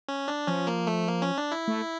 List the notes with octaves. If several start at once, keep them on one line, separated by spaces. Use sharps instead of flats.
C#4
D4
F3 C#4
A#3
A3
A#3
C#4
D4
E4
A3